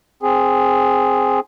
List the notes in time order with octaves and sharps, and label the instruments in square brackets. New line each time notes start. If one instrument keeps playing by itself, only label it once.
[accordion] C4 G#4